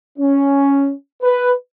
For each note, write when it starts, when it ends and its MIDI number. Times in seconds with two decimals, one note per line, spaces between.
0.18 0.91 61
1.21 1.51 71